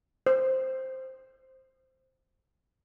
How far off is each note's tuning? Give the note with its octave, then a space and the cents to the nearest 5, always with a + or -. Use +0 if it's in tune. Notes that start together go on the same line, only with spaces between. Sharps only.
C5 +5